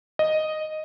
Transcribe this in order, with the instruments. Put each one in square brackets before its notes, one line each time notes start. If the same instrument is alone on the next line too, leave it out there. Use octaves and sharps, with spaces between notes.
[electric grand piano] D#5